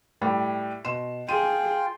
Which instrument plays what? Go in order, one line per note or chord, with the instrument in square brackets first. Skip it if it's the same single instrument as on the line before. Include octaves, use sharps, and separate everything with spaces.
[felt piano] A2 G3
B2 C6 E7
[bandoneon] F4 G5 C6 [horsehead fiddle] G#4 [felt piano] D#7